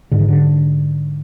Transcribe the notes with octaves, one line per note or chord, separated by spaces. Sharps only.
G#2 D3
D#3
D3